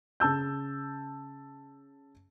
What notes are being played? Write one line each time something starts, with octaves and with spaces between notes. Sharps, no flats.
C#3 A5 E6 G6